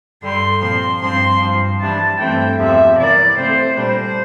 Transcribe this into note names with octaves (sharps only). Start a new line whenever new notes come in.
G2 D3 G3 C6
A#2 F3 C4 C6
G2 F3 C4 C6
G2 F3 C4
G2 E3 G3 D4 A5
G2 E3 A3 C4 G5
E2 C3 F3 E5
C3 E3 A#3 D5
C3 E3 A3 C4 C5
A#2 G3 D4 C5